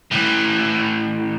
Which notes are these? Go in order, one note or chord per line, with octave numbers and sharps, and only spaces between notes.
A2 E3